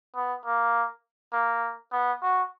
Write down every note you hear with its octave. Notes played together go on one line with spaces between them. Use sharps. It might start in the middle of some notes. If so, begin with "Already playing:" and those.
B3
A#3
A#3
B3
F#4